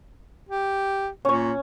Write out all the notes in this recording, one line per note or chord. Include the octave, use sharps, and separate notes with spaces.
G4
A#2 C#4 C#5